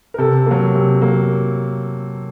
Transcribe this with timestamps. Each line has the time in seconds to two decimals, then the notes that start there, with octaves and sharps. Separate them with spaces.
0.14 A#4
0.18 C3 A4
0.46 F#3 A#3
0.75 C3
1.02 F#3 A#3